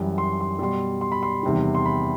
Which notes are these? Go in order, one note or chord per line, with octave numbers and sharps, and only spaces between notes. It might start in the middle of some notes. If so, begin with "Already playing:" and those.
Already playing: F#2 E3 G3
C6
C6
B2 G3 C6
C6
B5
C6
E2 C3 D#3 G3
C6
B5